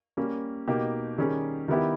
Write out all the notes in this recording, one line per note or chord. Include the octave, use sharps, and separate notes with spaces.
G3 A#3 C#4
B2 A#3 D#4 G4
D#3 G3 C#4 G#4
D#3 G3 B3 E4 G4